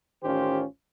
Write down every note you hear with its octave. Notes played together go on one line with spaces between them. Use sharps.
A1 D#3 C#4 F4 G4 C5